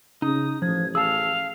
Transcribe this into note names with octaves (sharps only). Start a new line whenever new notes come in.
C#3 D#4 D#6
A1 F3 G#6
G#4 F5 A5 E6